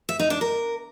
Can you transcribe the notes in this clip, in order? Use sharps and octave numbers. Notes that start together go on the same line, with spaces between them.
E5
D#4
D4
A#4